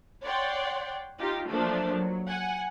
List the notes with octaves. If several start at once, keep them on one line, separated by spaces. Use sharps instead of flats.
C#5 D5 F#5 G5 C6
D#4 F4 G4
F3 F#3 A3 A#3 D4
F#3
F#5 G#5